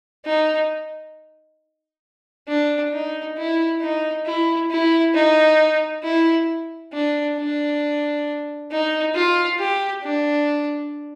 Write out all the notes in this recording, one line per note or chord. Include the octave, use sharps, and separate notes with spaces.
D#4
D4
D#4
E4
D#4
E4
E4
D#4
E4
D4
D4
D#4
F4
G4
D4